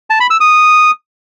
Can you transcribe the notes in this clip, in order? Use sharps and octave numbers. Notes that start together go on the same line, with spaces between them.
A5
B5
E6
D#6